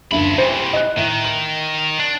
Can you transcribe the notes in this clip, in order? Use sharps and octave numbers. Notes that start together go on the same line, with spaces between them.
F#1 D2 F3 B5
C3 E3 C5
D#5 F#6
A2 D#3
F#7
D4